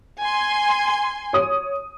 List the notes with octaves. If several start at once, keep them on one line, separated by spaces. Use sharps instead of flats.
G#5 C6
C#5 D#6